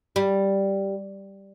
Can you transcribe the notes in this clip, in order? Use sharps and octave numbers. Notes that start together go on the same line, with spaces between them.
G3